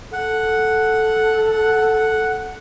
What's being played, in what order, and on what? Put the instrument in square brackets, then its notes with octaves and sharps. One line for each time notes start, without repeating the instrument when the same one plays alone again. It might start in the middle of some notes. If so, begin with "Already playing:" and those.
[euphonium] A4 [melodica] F#5